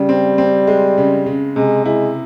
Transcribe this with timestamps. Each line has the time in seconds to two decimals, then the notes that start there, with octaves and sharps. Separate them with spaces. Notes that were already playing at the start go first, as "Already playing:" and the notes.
Already playing: C#3 G3
0.09 C4
0.38 C4
0.67 G#3
0.98 C#3
1.26 C#3
1.56 C3 G#3
1.85 G#3 E4